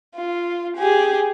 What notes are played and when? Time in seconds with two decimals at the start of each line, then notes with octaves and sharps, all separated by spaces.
0.15 F4
0.76 G4 G#4